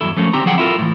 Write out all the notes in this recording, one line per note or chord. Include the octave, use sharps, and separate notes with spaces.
E2 G2 F#3 E4 A4
F3 F#3 A3 A#3 C#4
D3 C4 D#4 G4 A#5
F3 F#3 G#4 F#5 G5
E4 F4 A4 A#4
A2 E3